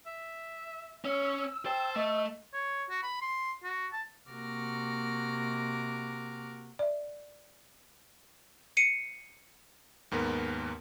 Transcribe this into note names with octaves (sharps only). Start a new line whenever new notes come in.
E5
C#4 E6
C5 G5 A5
A3 D#5
C#5
F#4
B5
C6
F#4
A5
C3 A#3 F#4 D6 F6 A#6
D5 E5
C7 C#7 D#7
D#2 G#2 B3 A#4